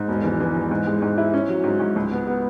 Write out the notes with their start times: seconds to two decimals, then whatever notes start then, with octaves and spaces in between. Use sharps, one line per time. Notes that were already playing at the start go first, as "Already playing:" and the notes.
Already playing: G#2
0.08 E1
0.24 E3
0.40 E3
0.55 E3
0.71 G#2
0.87 G#3
1.02 G#2
1.18 E4
1.34 C#4
1.49 F#3
1.64 G#2
1.80 G#2
1.96 C#2
2.11 B3
2.27 B3